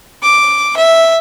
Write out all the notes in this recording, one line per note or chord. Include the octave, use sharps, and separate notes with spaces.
D6
E5